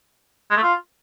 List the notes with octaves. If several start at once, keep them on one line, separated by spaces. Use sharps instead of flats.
G#3
A3
F4